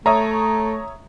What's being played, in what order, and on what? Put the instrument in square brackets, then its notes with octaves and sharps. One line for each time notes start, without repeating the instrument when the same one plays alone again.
[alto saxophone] A3 [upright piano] C#5 E5 D#6 [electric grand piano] A#5